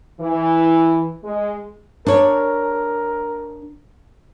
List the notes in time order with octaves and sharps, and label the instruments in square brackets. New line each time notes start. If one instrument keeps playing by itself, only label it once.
[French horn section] E3
G#3
[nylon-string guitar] D4 C#5 [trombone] A#4